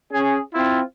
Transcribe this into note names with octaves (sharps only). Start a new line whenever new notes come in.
C#4 G#4
C4 E4 F4